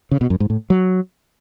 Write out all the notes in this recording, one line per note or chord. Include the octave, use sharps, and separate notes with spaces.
C#3
B2
F#2
G#2
A2
F#3